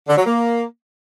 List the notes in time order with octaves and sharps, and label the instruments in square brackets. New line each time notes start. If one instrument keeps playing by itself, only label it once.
[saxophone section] D3
F#3
A#3